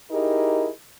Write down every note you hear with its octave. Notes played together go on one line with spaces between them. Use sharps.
D#4 E4 G4 G#4 A#4 D#5